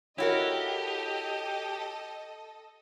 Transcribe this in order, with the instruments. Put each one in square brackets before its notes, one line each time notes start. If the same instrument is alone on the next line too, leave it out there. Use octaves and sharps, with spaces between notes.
[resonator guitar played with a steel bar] E4 F#4 A#4 [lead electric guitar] G4 [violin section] A4 D#5 [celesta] C#5 D7